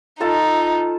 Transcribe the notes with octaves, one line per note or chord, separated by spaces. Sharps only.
D#4 F4 A4 A5